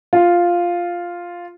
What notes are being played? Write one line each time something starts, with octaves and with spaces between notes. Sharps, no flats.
F4